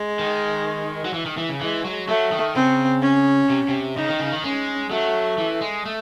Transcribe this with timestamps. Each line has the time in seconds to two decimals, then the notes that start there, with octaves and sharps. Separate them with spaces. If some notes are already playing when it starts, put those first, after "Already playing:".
Already playing: G#3
0.19 D#3
1.05 F#3
1.14 E3
1.26 D#3
1.37 E3
1.49 C#3
1.61 E3 G#3
1.85 F#3
2.08 F#3 A3
2.32 D#3
2.55 C#3 C4
3.02 C#4
3.50 C3
3.69 C3
3.97 C#3 D#4
4.09 D#3
4.20 C#3
4.32 D#3
4.44 G#3 C#4
4.91 F#3 A3
5.38 E3
5.61 G#3
5.85 A3